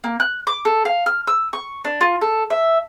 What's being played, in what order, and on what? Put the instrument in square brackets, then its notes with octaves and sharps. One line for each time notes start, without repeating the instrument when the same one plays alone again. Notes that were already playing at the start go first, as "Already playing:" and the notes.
[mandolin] A#3
F#6
D6
A4
F5
F6
E6
C#6
D4
F4
A4
E5